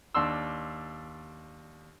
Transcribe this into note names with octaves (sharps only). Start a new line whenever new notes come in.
D#2 D4 C6 E6